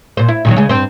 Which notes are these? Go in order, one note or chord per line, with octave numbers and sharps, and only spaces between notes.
A#2 C5
E4
A#2 D#3 F#3
C#3 G#3
G2 C4 C5